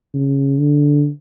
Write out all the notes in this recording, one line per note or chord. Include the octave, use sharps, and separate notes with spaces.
C#3
D3